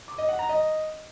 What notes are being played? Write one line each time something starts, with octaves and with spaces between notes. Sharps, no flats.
D6
D#5
F#5
A#5
D#5